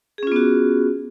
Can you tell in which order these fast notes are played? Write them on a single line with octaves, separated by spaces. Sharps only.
G#4 C#4 F4 B3 F#4